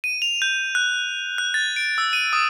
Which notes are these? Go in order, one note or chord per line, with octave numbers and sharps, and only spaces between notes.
D#7
F7
G6
F#6
F#6
A6
D7
E6
D#7
D#6